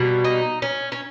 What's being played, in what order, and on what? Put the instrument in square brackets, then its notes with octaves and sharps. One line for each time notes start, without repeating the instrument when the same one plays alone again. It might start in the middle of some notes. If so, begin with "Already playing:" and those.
Already playing: [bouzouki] B2 G3 A#3
D#4
C#4
C#4